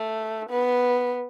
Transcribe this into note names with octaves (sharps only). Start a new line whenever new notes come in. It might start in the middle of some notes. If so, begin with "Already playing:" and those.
Already playing: A3
B3